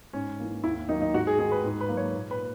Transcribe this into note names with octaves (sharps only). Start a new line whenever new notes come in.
G#2 C#4
E3 A#3
D#2 E4
D#3 F#3 A#3 D#4
D#4
G#2 F#4
G#4
D#3 G#3 G#4
B4
G#2
B4
F#3 A#3
C#5
A#2
B4
A#3